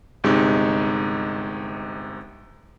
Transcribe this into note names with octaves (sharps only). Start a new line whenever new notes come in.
G1 C3 G#3 D#4